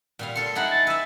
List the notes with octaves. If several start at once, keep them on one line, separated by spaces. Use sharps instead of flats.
A#2 G3 F5
F4 A4 C6 C#7
D#4 E4 G#4 F#5
A6
B4 E5 E6